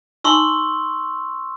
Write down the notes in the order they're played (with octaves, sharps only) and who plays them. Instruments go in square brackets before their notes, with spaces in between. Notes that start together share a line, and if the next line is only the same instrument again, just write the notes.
[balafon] D#4 G#5 A5 [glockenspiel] C6 C#6 E6